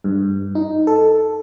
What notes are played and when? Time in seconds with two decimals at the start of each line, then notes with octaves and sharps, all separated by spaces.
0.04 G2
0.55 D#4
0.87 A4